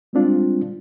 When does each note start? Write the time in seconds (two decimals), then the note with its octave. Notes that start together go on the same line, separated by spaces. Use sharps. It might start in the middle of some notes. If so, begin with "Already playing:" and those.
0.13 G3 G#3 C4 D4 F4